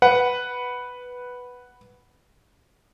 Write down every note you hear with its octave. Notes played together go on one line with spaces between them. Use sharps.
B4 F#5